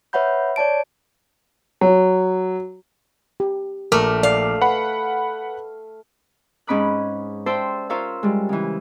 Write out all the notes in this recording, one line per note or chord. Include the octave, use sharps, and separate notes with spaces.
B4 C#5 E5 F#5 B5 G6
C#5 D5 A5 D7
F#3
G4
A#1 A3 A#4 D6 F6
D5 F5
B4 F#5 B5
G#2 C#4 D#5 B5 D6 F#6
C5 D5 E5 G5 A5 C6
F4 A#4 C5 C#5 E5 F5
G3 G#3
C#3 E3